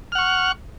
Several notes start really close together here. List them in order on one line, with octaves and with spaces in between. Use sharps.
F6 F#5 C#6